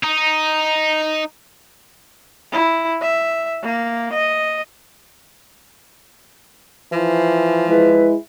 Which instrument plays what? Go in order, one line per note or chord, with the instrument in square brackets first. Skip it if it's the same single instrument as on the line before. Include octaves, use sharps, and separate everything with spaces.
[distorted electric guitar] D#4
[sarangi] E4
E5
A#3
D#5
[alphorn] E3 [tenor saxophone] F3
[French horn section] G#3 E4 [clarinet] B4